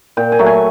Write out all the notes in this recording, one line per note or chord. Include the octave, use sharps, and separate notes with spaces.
A#2 G5
G#5
F#3 A3
G#5